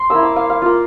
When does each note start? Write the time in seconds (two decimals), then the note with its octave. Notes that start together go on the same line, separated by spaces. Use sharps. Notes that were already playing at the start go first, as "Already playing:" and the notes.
Already playing: C6
0.10 A#3 E4 E6
0.23 D6
0.36 F5
0.50 F5
0.62 A#3 F4 F5